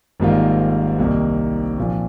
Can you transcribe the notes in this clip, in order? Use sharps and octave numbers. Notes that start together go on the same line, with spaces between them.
G#1 G#2 G3 A#3 F4
C2 C3 D#3 A#3 D#4
A#2 F3 C4 F4